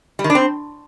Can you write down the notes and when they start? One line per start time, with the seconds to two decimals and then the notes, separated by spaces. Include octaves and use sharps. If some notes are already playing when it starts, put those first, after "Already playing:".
0.19 G3
0.24 D#3
0.30 D4
0.35 C4